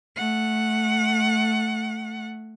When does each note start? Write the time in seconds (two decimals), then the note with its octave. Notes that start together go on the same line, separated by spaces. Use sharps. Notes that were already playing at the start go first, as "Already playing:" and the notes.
0.17 A3 F#5